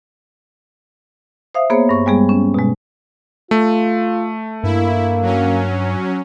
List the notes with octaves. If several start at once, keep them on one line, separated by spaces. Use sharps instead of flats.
C5 E5 F5 D#6
A#3 B3 G#4 C5 C#5
G2 C#6
G3 G#3 B3 G#4
C#4
B2 G#3
A3 F4
G2 A#3 E4
F#3 C#4